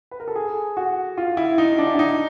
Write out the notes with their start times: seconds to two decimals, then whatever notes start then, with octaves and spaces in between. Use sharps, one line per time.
0.11 B4
0.20 A#4
0.28 A4
0.36 G#4
0.77 F#4
1.18 F4
1.37 E4
1.58 D#4
1.78 D4
1.95 D4
1.99 D#4